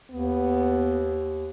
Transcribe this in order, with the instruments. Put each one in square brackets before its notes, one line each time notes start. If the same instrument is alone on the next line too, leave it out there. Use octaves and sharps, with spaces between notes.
[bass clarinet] D#2 [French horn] B3